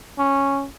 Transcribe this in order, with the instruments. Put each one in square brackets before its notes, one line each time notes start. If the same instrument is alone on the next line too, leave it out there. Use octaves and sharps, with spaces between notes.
[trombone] C#4